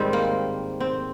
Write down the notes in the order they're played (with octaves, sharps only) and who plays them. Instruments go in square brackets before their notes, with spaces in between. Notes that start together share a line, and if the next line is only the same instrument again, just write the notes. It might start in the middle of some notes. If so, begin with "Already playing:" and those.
Already playing: [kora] G#2 D#3 G3 C4
A#3
C4